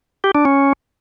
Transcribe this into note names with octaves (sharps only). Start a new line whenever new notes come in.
G4
D4
C#4